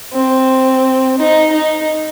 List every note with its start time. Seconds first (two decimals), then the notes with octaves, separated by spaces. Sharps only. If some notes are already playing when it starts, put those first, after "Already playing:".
0.13 C4
1.18 D#4
1.52 D#4